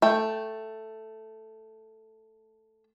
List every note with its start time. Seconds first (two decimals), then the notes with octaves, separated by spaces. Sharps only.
0.02 A3 G5